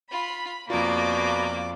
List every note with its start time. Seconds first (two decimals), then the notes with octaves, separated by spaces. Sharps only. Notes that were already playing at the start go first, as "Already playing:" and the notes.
0.11 F4 B5
0.70 F2 B2 A#3 F4 D5 D6